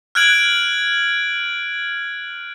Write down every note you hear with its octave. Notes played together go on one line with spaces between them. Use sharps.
F6 F#6 G#6 D7 F#7